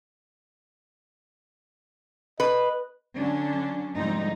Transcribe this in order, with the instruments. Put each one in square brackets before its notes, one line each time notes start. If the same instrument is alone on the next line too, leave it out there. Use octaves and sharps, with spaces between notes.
[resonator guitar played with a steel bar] B4 [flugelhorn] D#5
[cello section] D3 F#3 C#4 D4
D2 G#2 F3 G3 C4 D#4